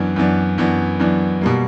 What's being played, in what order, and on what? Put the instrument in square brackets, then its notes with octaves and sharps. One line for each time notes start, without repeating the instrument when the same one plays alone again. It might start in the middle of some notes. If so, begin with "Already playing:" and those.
Already playing: [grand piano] F#2 E3 B3 D4
F#2 E3 B3 D4
F#2 E3 B3 D4
F#2 E3 B3 D4
B2 G3 A#3